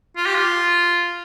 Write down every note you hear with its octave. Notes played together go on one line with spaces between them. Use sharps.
F4
G4
F4